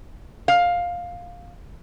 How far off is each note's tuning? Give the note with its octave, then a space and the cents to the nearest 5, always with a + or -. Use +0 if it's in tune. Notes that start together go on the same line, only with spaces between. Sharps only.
F5 +10